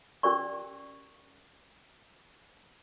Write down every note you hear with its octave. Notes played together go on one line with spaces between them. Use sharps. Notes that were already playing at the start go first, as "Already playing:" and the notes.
C#4 G4 A#4 D5 C#6